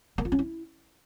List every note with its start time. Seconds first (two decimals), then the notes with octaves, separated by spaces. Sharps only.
0.18 A#3
0.25 F4
0.32 C#4
0.39 E4